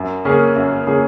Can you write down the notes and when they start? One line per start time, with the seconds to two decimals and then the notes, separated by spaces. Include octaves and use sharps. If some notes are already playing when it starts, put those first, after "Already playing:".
Already playing: F#2
0.25 C#3 A#3 C#4 G#4
0.56 F#2
0.87 C#3 A#3 C#4 G#4